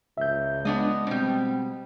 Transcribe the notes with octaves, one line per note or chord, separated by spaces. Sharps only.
C#2 E5 G6
G#3 B3 D4 D#5
B2 G3 C4